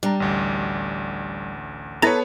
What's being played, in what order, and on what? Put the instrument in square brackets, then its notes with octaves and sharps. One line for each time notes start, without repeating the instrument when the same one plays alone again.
[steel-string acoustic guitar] G3 [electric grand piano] D4 A#5
[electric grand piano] A1 D2
[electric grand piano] B3 B4 C#5 [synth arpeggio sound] E4 A5 A#5 [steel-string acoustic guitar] A4